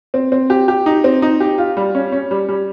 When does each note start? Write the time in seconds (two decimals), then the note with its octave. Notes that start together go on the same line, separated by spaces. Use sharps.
0.14 C4
0.32 C4
0.50 G4
0.68 G4
0.86 D#4
1.04 C4
1.22 D#4
1.40 G4
1.58 F4
1.77 G3
1.95 C#4
2.12 C#4
2.31 G3
2.49 G3